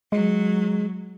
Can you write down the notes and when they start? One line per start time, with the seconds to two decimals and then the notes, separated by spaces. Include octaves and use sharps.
0.12 F#3 G#3